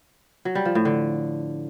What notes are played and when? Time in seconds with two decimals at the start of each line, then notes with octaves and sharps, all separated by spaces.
0.45 F#3
0.55 G3
0.65 F3
0.75 A2
0.85 D3